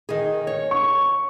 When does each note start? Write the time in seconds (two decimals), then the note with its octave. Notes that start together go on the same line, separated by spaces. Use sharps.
0.09 D#3 G#4
0.47 C#5
0.71 C#6